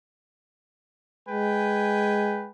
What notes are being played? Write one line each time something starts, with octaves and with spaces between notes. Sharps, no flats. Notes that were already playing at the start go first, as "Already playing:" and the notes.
G#3 B4 G5 G#5